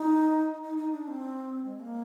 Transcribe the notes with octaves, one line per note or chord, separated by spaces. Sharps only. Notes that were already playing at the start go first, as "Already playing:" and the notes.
Already playing: D#4
D#4
D#4
D4
C4
G#3
A#3